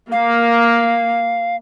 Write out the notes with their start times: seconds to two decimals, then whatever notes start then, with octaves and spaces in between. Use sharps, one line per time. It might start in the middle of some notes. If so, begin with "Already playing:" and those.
0.12 A#3 F5